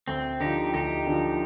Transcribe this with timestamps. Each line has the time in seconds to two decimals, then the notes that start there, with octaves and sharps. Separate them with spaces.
0.08 D2 C4
0.40 D3 F3 D#4 G4
0.74 D2 D#4 G4
1.07 D3 F3